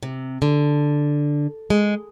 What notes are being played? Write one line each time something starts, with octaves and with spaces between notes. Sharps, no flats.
C3
D3
G#3